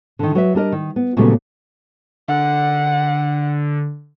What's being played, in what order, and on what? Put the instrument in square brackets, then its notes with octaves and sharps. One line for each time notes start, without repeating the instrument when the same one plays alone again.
[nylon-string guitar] D3 D#3
F#3 B4 E5
G3 D4 A#4 D#5
D#3
B3
A#2 C#3 F#3 G3 A3 B3
[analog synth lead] D3 [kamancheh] F#5